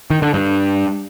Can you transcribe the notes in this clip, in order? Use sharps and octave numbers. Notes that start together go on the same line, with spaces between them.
D#3
D3
G2